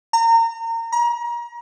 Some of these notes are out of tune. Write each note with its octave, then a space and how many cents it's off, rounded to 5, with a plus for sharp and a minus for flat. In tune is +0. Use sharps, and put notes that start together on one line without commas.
A#5 -30
A#5 +35